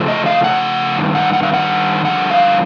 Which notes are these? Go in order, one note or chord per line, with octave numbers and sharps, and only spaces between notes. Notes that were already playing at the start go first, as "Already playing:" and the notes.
Already playing: C#3 F3 A3
D#5
F5
F#5
G2 D#3
F#5
F#5
F5
F#5
G2 D3 F3 F#5
F5